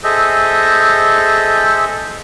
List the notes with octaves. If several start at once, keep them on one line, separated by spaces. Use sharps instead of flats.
G#4 A4 C5 D#5 E5